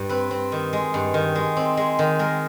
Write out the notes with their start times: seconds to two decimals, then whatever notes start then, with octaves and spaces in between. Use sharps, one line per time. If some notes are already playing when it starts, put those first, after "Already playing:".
Already playing: G2
0.09 C4 B4
0.31 C4
0.52 D#3
0.73 G#3
0.94 G2
1.14 D#3
1.35 G#3
1.57 C4
1.77 G#3
1.99 D#3
2.19 G#3 A#4